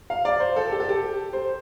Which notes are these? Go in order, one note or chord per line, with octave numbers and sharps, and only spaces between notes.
F5
D5
C5
A4
G4
A4
G4
C5